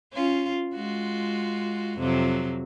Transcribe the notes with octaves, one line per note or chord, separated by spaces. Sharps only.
C#4 F4
G#3 F4 F#4
F2 C3 F#3